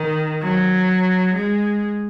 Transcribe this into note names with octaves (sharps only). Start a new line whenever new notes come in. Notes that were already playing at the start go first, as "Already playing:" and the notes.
Already playing: D#3
F#3
G#3